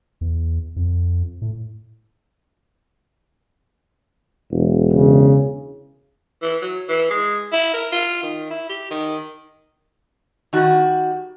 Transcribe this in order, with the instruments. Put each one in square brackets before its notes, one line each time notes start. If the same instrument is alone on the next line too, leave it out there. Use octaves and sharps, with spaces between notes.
[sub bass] E2
F2
A2
[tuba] E1
[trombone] C#3
[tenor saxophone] E3
F#3
E3
G#3
E4
A#4
F4
D#3
E4
G4
D#3
[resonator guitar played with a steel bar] D#3 G3 F#4